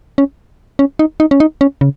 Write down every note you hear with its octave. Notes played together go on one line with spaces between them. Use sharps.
C#4
C#4
D#4
D#4
C#4
D#4
C#4
C#3